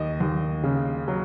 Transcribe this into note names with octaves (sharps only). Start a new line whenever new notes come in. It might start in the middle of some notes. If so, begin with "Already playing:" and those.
Already playing: D#2 D#5
D#2
C#3
F#3